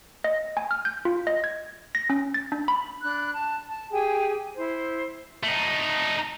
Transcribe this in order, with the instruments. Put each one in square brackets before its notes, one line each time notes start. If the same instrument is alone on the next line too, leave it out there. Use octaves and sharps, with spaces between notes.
[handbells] D#5
G#5
F6
G6
F4
D#5
G#6
A#6
C#4
A6
D4
B5
[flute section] D4 B5 F#6
A5
A5
G4 G#4 G5 G#5
E4 C5
[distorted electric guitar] A3 D#4